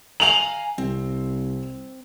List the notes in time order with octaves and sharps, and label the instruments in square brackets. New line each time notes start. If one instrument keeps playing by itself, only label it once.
[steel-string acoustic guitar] F5 G#5 A#5 [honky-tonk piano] F7 F#7
[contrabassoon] C2 [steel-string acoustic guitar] C4